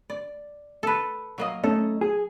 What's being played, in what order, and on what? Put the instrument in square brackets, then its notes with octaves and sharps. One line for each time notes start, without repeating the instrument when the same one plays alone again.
[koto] D5
A4 B4
F#3 A#3 D#5
[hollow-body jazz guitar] A3 C#4 D#4 [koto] A4
[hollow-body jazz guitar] G#4